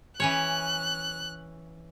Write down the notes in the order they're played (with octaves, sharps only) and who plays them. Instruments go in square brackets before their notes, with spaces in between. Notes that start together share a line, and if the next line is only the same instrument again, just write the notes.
[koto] E3 C#4 C#5 [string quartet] F#6